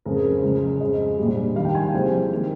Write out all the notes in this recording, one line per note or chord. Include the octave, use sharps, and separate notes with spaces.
F2 C#3 G#3 A#4
G#4
C5
C#2 C#3 G#3
F2 C#3 G#3 D#5
A#1 A#2 G3
D#2 D#3 G3 F5
G5
G#5
G5
C2 C3 F3 G#3
D#3 A#3